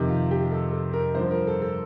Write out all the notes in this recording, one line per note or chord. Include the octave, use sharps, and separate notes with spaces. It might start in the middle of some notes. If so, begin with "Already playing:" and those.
Already playing: F2 C3 D#3 G4
F4
G4
A4
A4
A#4
G2 D3 F3 C5
A#4
A4
A4